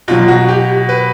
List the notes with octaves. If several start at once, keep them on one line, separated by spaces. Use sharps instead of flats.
B2 F#3 F4
F#4
G4
B4